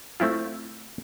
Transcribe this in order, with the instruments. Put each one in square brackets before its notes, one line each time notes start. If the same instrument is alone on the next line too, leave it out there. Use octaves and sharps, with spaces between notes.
[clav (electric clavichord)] A3 C4 E4 F4